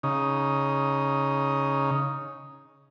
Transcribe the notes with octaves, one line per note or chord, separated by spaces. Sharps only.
C#3 D#4